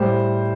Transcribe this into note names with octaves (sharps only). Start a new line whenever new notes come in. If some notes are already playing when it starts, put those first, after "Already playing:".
Already playing: A2 G3 C5